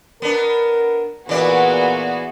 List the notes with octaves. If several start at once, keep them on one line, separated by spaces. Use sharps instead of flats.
B3 D4 A#4
A#2 E3 B3 F#4 G#4 D5 E5